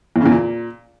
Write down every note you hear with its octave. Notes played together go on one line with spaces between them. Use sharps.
E2
C#3
E2
A#2